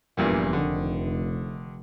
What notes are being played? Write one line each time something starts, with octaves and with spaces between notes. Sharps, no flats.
F1 E2 G2 A#2
D3 D#3